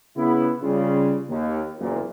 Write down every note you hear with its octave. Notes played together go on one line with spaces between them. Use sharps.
C#3 B3 E4
C#3 G3 F4
D#2
F#1 E2 A#2